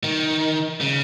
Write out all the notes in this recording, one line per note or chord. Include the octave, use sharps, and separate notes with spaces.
D#3
C#3